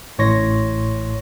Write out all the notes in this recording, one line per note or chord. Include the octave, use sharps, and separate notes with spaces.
A1 A2 C#5 C6 C#6 A#6